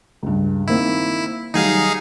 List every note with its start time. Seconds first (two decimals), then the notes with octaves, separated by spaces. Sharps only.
0.23 C#2 G2
0.67 D#3 A#3 C4 E4
1.54 D#3 F#3 G3 D#4 G#4 F5